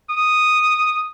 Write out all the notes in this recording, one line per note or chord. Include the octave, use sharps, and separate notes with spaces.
D#6